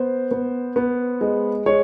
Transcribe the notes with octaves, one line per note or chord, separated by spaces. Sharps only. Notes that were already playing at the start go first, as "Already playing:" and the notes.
Already playing: B3 C5
B3
B3
G#3
G#3 C#5